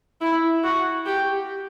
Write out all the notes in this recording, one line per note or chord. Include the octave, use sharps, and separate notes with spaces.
E4
F#4
G4